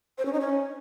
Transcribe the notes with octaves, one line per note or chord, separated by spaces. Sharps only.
C5
C#4
D#4
C#4